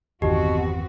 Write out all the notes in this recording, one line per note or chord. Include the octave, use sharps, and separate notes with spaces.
G1 E2 B2 D#3 B3 C4 F#4 G4